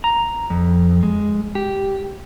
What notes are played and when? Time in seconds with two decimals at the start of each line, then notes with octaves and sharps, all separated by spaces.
0.04 A#5
0.50 F2
1.03 G#3
1.55 G4